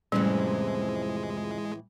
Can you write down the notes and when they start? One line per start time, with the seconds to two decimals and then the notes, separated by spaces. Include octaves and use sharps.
0.12 F2 A2 C3 E3 G3 G#3 C#4